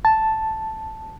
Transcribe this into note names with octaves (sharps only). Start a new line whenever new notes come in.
A5